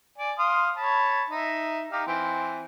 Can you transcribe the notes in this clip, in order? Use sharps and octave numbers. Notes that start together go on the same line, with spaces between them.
D5 G#5
F5 C6 D#6
C#5 A5 B5
D#4 E5
D#4 G4 F5
E3 C4